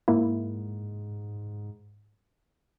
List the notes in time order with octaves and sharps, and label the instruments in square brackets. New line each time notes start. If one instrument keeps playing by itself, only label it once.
[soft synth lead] G#2 [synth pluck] A#3 E4